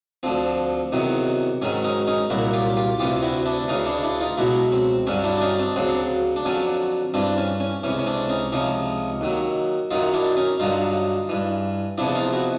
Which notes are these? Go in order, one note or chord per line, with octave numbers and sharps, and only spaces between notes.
D2 D3 F3 C4
E2 C3 D#3 F#3
G#2 D#3 F#3 C#4
C#4 D#4
C#4 D#4
C2 A#2 F#3 E4 F#4
F4 G4
F4 G4
D2 C3 E3 F4 G4
E4 F#4
D4 E4
D2 C#3 E3 C#4 D#4
D4 E4
D4 E4
D#4 F4
C#2 B2 F#3 E4 F#4
C4
G2 D3 F#3 C#4
D4 E4
D4
C#4 D#4
C4 D4
D2 C#3 F#3 C4 D4
D4
F2 D3 F#3 C#4
G2 E3 C4 D4
C#4
C#4
C#2 C3 E3 C#4
C#4
C4 D4
C#4 D#4
C#2 C3 F3 C#4 D#4
D#2 D#3 F#3
F#2 D#3 F#3 D#4 F4
D4 E4
C#4 D#4
G2 D3 F#3 D#4 F4
G2 E3
E2 C3 F3 D4 E4
D#4 F4
E4 F#4